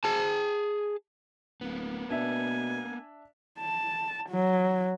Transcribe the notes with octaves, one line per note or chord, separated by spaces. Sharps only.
G#4 A5
D1 A#3 B3
B2 D4 E5 G#5
A5
F#3